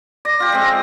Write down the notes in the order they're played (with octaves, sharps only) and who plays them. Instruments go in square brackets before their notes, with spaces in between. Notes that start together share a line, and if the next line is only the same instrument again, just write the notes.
[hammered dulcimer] D5 [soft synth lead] A#6
[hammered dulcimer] F4 G4
G#3 C4